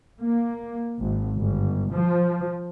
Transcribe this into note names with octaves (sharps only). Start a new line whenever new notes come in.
A#3
G#1
G1
F3